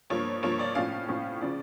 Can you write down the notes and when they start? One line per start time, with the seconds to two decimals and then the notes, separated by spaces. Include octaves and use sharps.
0.10 G2 F3 A#3 C#5
0.42 G2 F3 A#3 C#5
0.59 D5
0.75 A2 F3 C#4 F5
1.08 A2 F3 C#4
1.41 C#3 F3 C#4 D5